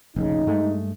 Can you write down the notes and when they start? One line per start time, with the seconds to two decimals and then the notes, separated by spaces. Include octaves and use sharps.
0.16 F1 A#1 C#3 D#4
0.47 G2 G#3 A3